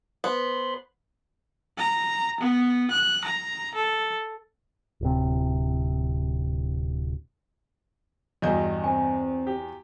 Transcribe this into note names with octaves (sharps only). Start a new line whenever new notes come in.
B3 C5 B5 C6
A#5
B3
F#6
A#5
A4
D1 C3
E2 G2 F#4 D#5 G6
C4 G#5
G4